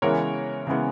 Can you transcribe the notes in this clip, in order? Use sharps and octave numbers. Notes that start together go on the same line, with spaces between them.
C#3 E3 G#3 B3 A#4 C#5
C#3 E3 G#3 B3